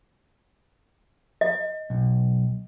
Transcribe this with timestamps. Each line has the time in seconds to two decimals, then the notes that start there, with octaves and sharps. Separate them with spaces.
1.41 D#5
1.90 B1